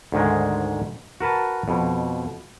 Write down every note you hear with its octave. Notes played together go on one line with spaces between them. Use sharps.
D2 G#2 D#3 G#3
F#4 A#4 B4 A5
F2 B2